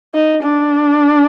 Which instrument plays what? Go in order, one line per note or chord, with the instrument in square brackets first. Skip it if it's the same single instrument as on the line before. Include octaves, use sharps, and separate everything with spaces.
[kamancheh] D#4
D4